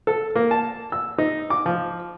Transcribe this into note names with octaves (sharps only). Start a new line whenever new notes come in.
A4
A#3
A5
E6
D#4
D6
F3